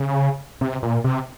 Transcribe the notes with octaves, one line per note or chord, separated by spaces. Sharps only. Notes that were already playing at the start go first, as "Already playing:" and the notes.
Already playing: C#3
C3
A#2
C3